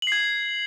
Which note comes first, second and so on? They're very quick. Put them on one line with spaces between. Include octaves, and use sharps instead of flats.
F#7 C7 G#6